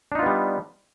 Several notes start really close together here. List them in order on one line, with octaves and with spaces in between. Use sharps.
D4 D#4 F4 B3 G3